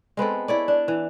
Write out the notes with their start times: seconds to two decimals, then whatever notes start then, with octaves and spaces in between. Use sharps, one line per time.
0.17 G#3 B3 C4 A4
0.48 E4 C#5 D5
0.68 D4
0.88 E3